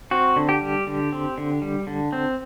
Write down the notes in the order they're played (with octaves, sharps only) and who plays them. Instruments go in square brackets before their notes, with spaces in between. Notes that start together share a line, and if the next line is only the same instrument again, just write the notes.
[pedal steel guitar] C4 F#4
D3
G4
G3
D3
C4
D3
G3
D3
C4